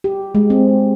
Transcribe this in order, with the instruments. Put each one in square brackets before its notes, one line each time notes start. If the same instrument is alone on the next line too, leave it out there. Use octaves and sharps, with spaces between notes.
[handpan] G4
G#3
C4